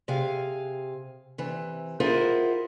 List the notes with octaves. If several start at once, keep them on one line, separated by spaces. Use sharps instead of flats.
C3 G#4 F5
C3 E3
E4 F4 G#4 A#4 C5 F#5